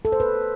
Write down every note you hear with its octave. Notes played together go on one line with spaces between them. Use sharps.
A4
C5
B4